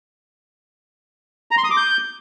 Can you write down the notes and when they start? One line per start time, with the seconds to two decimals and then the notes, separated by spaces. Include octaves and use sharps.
1.51 A#5
1.58 C6
1.64 D#6
1.71 D6
1.77 G6